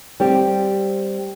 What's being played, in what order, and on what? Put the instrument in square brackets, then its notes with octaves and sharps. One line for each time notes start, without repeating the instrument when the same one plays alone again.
[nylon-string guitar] G3 C4 G4